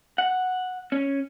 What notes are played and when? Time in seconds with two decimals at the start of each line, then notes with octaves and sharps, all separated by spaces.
0.18 F#5
0.92 C#4